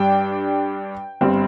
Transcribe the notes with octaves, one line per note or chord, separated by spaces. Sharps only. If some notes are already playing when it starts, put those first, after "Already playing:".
Already playing: G2 G3 D4 G5
G1 G2 G3 C4